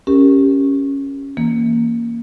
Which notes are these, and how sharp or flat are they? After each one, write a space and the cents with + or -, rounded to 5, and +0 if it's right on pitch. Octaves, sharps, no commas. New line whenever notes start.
C#4 +0 G4 +0 A#4 -10
E3 +0 A#3 +0